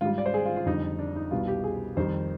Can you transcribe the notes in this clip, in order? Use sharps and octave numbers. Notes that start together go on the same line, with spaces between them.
G#2 G3 F4
D5
C5
G#4
F4
F4
F2 D3 G3 D#4
D4
D#4
C2 B2 G3 F4
G4
G#4
F2 D#3 G3 C5